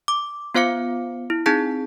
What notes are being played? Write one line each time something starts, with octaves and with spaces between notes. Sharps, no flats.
D6
B3 F4 C5 F5 D6 C#7
E4
C4 D#4 G#4 A5 G6 B6